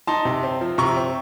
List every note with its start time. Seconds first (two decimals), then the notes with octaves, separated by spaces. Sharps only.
0.07 D#4 A5 C6
0.25 C3
0.43 C4
0.61 F3
0.78 C3 A#5 C#6
0.97 C4